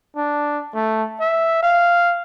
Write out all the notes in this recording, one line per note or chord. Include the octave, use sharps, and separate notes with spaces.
D4
A3
E5
F5